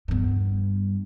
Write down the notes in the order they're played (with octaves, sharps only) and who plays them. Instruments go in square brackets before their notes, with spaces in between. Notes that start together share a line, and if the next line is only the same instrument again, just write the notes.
[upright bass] G2 B3